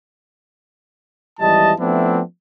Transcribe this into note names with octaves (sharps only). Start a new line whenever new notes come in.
G#1 E3 G3 D#5 A5
F3 A3 B3 C4 D4 E4